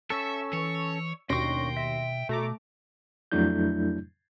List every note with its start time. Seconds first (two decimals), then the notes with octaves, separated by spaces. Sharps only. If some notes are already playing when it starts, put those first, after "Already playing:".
0.10 C#4 A4 E5 C#6 E6
0.53 E3 C#5
1.30 D#2 B2 C#4 D4 G5 C6 C#6 A#6
1.77 E5
2.29 B2 A3 A#5 D6
3.32 F2 F#3 A3 D4 E4 G6